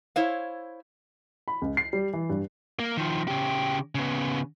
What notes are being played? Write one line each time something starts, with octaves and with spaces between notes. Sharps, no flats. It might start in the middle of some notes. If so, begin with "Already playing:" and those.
E4 C5 C#5 F5
B5
C#2
C7
G3
E3
G2
A#3
D#3 F3
C#3 G4
C#3 B3